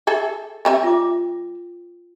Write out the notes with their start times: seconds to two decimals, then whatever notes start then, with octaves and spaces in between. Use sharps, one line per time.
0.07 G#4 A4 E5
0.65 G3 C4 E5 G5
0.83 F4 D6